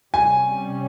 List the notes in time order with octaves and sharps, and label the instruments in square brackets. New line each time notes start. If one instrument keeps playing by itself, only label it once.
[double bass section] C3 G3 C#4 [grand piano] G#5